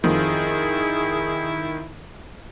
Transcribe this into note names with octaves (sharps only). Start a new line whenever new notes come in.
F2 D#3 F3 E4 G#4